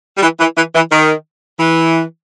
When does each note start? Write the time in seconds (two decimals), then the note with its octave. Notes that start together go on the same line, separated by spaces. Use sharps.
0.18 G3
0.23 E3
0.40 E3
0.57 E3
0.75 E3
0.92 D#3
1.60 E3